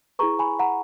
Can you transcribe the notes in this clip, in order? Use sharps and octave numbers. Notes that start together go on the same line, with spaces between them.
E4 G#4 B4 A#5 C#6
G#5 B5
F#5 A#5